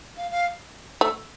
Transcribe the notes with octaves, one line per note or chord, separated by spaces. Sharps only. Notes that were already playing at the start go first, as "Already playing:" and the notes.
F5
F5
A3